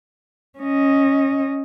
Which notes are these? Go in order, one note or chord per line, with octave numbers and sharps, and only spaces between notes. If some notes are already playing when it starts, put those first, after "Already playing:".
C#4 D#5